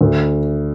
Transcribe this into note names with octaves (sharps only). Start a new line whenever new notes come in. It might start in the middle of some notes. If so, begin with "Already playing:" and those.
D2